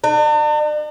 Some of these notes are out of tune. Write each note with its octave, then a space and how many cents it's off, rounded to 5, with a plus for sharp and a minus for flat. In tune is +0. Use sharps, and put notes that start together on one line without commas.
D4 +45